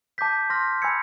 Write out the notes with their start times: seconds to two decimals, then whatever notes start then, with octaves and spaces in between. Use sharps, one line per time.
0.18 A5 D6 G6 B6
0.50 C6 F6 A#6
0.82 G#5 B5 E6 G#6 C#7